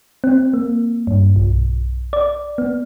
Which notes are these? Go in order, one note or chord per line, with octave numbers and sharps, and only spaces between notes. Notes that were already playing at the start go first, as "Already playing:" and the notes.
C4
A#3
G2
B1
D5
B3